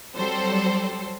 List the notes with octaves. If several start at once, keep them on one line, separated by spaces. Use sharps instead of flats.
F#3 G3 C4 A4 C5